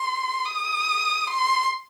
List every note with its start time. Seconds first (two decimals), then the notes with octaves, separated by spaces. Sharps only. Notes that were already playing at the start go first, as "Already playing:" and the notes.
Already playing: C6
0.44 D#6
1.27 C6